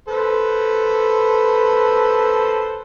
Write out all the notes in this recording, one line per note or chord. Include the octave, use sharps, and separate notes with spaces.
A4 B4 C5